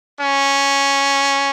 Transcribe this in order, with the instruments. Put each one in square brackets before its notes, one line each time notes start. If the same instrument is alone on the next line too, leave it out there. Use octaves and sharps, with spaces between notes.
[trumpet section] C#4